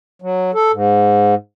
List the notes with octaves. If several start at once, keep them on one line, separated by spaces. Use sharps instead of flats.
F#3
A4
G#2